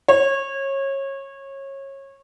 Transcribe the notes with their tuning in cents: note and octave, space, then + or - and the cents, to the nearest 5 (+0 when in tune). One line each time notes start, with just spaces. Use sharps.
C#5 -25